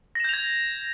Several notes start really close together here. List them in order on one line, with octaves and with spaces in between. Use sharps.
A#6 E7 G6 F7 G#6